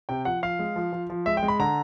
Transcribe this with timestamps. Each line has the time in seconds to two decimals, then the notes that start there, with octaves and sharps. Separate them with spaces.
0.09 C3 G5
0.25 F3 F#5
0.42 F3 F5
0.59 G#3
0.76 F3
0.93 F3
1.10 F3
1.26 G#3 E5
1.37 G5
1.43 G#3
1.48 B5
1.59 D3 A#5